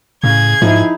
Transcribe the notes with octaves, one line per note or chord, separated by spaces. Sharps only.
A2 C#3 G#4 G#6
G#2 F3 D#4 E4